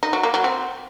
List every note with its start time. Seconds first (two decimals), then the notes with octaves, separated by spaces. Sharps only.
0.03 D#4
0.13 F#3
0.23 A#3
0.34 F#3
0.44 C4